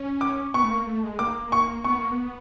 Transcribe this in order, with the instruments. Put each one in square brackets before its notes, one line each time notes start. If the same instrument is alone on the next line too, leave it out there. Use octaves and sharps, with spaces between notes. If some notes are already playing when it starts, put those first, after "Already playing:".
Already playing: [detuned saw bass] C#4
[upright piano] D6
[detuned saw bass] B3 [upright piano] C#6
[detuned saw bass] A3
A#3
A3
G#3
[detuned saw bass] A#3 [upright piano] D6
[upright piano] C#6
[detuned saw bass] B3 [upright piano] C#6
[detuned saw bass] A#3
B3